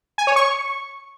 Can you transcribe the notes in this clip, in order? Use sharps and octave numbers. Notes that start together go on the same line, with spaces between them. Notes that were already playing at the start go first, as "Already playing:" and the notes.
G#5
C#5
C#6